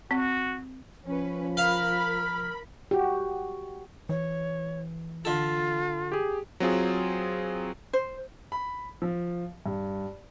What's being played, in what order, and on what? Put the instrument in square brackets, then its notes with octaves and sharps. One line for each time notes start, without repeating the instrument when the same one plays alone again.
[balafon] C4 [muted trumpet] F#4
[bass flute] F3 [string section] C#4 B4
[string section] A#4 B5 [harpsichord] F5 [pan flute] F6
[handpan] F#4 G4
[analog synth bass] E3 [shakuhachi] C#5
[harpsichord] D3 A4 [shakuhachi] F4
[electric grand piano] G4 G#4
F#3 C4 F4 G#4
[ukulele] C5
[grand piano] B5
F3
G2